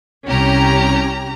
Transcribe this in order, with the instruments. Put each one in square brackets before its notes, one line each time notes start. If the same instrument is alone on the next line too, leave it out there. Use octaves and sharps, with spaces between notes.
[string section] C2 C#4 G4 A#5